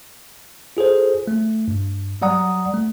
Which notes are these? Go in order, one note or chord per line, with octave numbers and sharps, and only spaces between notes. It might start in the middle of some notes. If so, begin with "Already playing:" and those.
F4 G#4 A4 C5
A3
G2
F#3 G3 D5 F#5 A#5 D#6
A3